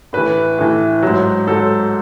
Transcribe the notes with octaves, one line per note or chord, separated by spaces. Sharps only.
A2 E3 B4
A2 E3
G#2 F#3
G#2 F#3 A4